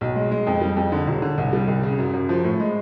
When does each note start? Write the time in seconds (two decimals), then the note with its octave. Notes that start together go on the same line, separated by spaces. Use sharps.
0.01 B1
0.16 G#3
0.31 G#3
0.47 F2
0.61 G3
0.77 F2
0.92 D3
1.07 E1
1.22 D3
1.38 C2
1.53 G3
1.68 C2
1.83 C#3
1.99 F#2
2.14 F#2
2.29 F3
2.44 A2
2.60 G#3